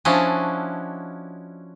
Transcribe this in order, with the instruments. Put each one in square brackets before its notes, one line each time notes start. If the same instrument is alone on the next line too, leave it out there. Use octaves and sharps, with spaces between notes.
[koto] F3 C#4 D4 E4 F#4 D#5